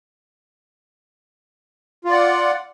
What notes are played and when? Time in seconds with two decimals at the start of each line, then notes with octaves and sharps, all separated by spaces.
2.05 F4
2.09 D5
2.13 F#5